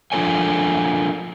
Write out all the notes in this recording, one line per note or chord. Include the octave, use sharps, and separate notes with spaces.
F3 D4 F4 A4 C#5 G#5